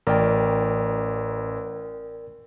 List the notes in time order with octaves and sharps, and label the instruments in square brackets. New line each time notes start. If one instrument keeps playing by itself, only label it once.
[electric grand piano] A1 [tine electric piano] A#4 D5 G5